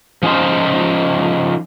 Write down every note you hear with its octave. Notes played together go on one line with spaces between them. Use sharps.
F3 C#4 D#4 F4 C5